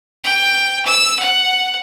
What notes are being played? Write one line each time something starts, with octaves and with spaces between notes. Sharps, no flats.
G5
E6
F#5